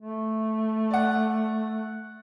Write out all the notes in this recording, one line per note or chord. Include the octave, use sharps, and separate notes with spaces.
A3
D5 F#5